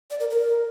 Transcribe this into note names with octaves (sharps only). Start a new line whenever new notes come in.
D5
A#4
A#4